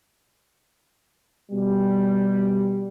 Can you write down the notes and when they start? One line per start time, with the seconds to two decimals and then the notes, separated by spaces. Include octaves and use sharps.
1.51 B2 G3